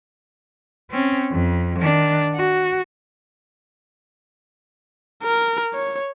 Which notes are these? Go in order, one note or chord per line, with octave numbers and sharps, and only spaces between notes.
C4 C#4
F2
D#3 D4
F#4
A#4
C#5